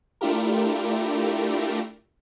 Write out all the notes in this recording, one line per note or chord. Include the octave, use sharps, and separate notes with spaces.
A3 D4 E4 F4 G4 A#4